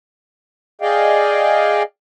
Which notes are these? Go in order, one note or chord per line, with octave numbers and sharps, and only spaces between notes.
G#4 D5 D#5 F5 G5